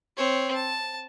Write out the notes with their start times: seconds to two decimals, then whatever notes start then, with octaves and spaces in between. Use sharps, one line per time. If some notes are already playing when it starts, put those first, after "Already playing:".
0.17 C4 C#5
0.56 A5